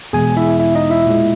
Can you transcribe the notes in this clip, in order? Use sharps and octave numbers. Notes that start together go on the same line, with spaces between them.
E2 B2 G#3 G#4 G#5
E4 E5
E4 E5
D#4 D#5
E4 E5
A#2 G#3